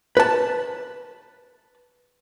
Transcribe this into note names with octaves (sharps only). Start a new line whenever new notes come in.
B4 A5